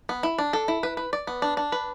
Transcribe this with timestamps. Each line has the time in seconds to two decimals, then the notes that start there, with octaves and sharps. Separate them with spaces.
0.09 B3
0.23 E4
0.39 D4
0.53 A4
0.68 E4
0.83 B4
0.97 B4
1.13 D5
1.27 B3
1.42 D4
1.57 D4
1.72 B4